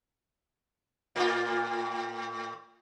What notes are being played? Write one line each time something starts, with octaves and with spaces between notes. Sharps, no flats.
A2 F4